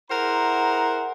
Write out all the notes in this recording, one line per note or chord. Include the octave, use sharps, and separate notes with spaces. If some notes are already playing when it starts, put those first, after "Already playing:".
E4 G#4 A#4 C5 F#5 A#5